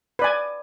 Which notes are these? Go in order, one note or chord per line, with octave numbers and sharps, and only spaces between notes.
B4 D5 G#5